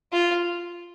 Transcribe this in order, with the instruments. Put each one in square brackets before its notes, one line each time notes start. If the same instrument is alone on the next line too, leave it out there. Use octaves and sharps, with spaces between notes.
[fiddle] F4